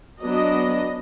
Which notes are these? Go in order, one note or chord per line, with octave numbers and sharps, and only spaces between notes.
F#3 B3 D4 D#5